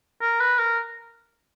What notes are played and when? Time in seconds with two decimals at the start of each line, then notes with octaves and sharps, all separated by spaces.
0.22 A#4
0.41 B4
0.59 A#4